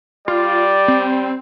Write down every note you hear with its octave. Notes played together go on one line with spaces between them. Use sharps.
G3 F4 D5
C4